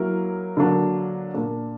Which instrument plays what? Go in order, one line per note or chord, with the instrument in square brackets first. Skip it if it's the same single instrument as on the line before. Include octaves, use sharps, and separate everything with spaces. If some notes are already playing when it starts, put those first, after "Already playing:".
Already playing: [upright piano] F#3 A#3 E4 A#4
D3 F#3 A#3 D4
A#2 A#3 D4